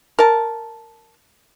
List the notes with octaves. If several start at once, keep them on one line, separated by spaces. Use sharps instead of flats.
A#4 A5